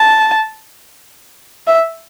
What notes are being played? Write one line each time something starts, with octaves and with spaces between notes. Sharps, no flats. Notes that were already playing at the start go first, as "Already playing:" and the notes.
Already playing: A5
E5